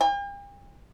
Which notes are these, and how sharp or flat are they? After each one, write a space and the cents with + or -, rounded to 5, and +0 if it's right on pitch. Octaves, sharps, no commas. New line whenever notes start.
G5 +45